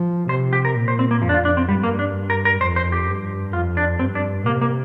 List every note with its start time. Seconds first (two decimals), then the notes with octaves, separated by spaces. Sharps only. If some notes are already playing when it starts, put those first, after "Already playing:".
Already playing: F3
0.29 C3 C5
0.53 G4
0.65 A#4
0.75 A#2
0.88 C5
0.99 C4
1.11 A#3
1.22 F2 F3
1.29 D4
1.34 F4
1.45 D4
1.57 C4
1.69 G2 G3
1.83 A#3
1.99 D4
2.30 A#4
2.45 A#4
2.61 F2 C5
2.76 C5
2.92 G4
3.08 G2
3.53 F2 F4
3.77 D4
3.99 G2 C4
4.15 D4
4.46 C3 A#3
4.62 A#3